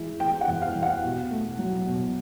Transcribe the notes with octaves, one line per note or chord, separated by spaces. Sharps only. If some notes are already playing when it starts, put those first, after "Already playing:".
Already playing: E3 G#3
E3 G5
F#5
E2
F5
E2
F#5
B2
A3
F#3
B2